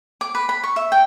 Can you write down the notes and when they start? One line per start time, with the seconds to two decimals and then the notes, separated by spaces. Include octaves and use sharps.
0.21 D6
0.35 B4
0.49 B5
0.64 C#6
0.76 E5
0.92 G5